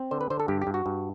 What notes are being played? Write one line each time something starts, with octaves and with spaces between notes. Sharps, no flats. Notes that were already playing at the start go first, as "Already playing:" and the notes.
Already playing: C4
D3 C5
B4
D3 C5
A4
G2 G4
G4
G2
F#4
G2